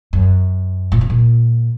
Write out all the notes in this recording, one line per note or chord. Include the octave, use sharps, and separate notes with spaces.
F#2
A#2
C3
A#2